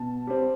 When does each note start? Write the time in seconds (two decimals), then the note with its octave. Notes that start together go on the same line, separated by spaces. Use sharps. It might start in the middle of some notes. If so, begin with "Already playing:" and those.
Already playing: B2 A5
0.27 G3 C4